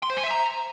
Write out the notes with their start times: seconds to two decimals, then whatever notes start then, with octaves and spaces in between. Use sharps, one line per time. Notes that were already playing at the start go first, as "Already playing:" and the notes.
0.03 C6
0.10 C5
0.17 G#5
0.24 E5
0.31 A#5